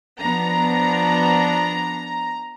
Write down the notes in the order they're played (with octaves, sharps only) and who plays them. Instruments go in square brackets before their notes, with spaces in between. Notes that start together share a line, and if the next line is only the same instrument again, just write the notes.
[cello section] F3 B3 D4 [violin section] A#5